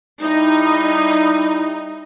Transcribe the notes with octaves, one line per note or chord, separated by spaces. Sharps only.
G3 D#4 E4